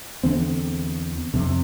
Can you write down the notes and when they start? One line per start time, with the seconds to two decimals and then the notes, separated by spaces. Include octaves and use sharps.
0.23 E2 D3 C4
1.34 F2 C3